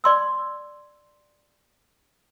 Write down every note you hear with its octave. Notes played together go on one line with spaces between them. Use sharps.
D5 C6 E6